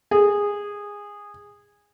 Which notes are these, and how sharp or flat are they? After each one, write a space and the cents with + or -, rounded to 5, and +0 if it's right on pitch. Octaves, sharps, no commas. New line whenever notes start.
G#4 -15